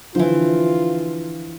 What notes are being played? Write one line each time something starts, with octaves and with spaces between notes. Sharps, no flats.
D3 E3 F3 F4 C5